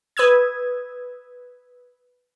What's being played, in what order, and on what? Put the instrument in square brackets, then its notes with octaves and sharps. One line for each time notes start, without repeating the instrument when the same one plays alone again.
[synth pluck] B4 D#6 E6 G#6